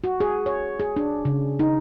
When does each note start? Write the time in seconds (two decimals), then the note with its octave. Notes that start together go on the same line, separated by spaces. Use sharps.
0.04 F#4
0.20 G#4
0.46 C#5
0.80 G#4
0.96 D4
1.25 C#3
1.59 D#4